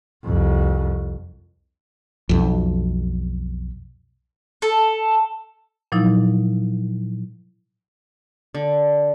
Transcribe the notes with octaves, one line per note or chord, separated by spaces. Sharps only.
C2 F2
B1 F2
A4
A#2 F3 F#3 D#4 E4
D3